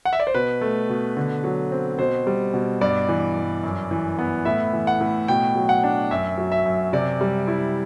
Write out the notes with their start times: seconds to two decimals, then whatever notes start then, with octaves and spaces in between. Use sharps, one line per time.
0.05 F#5
0.13 E5
0.20 D5
0.27 C5
0.34 B2 B4
0.61 A3
0.89 B2
1.17 D3
1.44 F#3
1.72 C4
1.99 B2 C5
2.27 G3
2.54 B2
2.81 G2 D5
3.09 E3
3.36 G2
3.64 F#2
3.91 E3
4.19 B3
4.45 A2 E5
4.73 E3
4.87 F#5
5.01 A2
5.28 B2 G5
5.56 F#3
5.69 F#5
5.84 D4
6.11 F#2 E5
6.38 F#3
6.52 E5
6.66 F#2
6.93 C3 D5
7.21 G3
7.48 E4